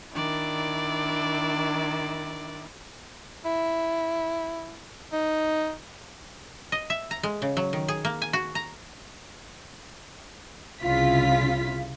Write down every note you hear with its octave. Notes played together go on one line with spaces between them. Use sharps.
D#3 D4 E4 D5
E4
D#4
D#5
E5
A#5
G#3
C#3
F#3
D#3
G#4
A#3
G#5
F#4
A#5
C2 C#3 E4 F4 B6